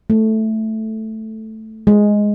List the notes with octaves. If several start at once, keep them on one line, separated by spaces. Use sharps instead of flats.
A3
G#3